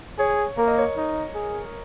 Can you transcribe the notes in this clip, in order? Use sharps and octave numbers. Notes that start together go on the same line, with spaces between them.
G#4 C#5
A#3 A#4
D#5
C#5
D#4
G#4